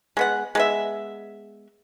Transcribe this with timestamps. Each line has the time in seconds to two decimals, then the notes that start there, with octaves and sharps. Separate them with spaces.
0.17 G#3 B3 F#5
0.55 G#3 B3 E5